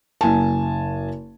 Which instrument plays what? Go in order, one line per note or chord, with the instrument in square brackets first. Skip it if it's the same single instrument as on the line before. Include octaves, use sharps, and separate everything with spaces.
[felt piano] F#1 G#5 A5